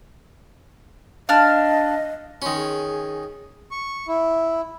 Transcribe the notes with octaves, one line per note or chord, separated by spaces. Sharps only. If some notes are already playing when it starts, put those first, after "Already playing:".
D4 D#5 F5 A5 F6
D#3 C#4 C6
G#4
C#6
E4